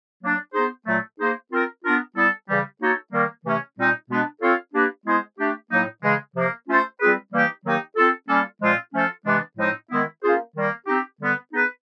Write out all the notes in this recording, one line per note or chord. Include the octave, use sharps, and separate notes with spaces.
F#3 A#3 D4
B3 D#4 G#4 C5
A#2 F#3 A3
A#3 D#4 G#4 C5
C4 F4 A#4
B3 D4 F4 A#4
G3 B3 E4 A4
C#3 E3 G3
A#3 D#4 F#4 A4 C#5
D#3 G3 A#3
C3 E3 A3 C#4
A#2 G3 C4 D#4
B2 G#3 B3 D4
C4 F4 A4 C#5 F5
A#3 D4 G4 B4 D5
G#3 B3 E4 G#4 C5
A3 D4 G4
A2 F#3 A#3 D#4
C#3 E3 G#3
C3 F3 A#3
A3 C#4 F4 A4 C5
G3 C4 F4 G#4 B4
E3 G3 A#3 D#4 G4
D#3 F#3 A#3 D#4 G4
C4 F4 A4
G3 A#3 C#4 F4 A4
A#2 F3 G#3 C4 F4
F3 A3 C#4 F4 A4
C3 E3 G#3 B3 D4
A2 F3 G#3 C4 D#4
D#3 G#3 B3 E4
A#3 C#4 F4 G#4 C5
D#3 G3 A#3
C4 D#4 G4
D3 G3 B3
B3 D#4 G#4 B4